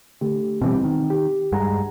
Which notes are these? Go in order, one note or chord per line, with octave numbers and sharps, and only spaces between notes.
D3 A3 G4
B2 E3 G3 C4
D#3
G4
G2 G#3 F#5 A#5